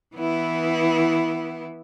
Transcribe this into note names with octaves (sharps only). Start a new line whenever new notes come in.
E3 B3 E4